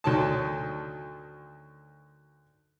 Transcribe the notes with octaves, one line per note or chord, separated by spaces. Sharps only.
D2 D#3 F#3 A5